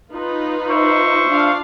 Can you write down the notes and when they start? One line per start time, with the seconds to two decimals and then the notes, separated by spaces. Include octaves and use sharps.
0.12 D#4 F4 B4
0.69 C5 E5 C#6
1.27 D4 F4 F5